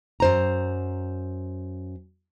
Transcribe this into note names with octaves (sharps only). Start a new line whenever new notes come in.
F#2 C5 A#5